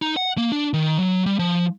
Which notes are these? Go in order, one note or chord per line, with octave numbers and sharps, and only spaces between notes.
D#4
F#5
A#3
D4
D#3
F#3
G3
F3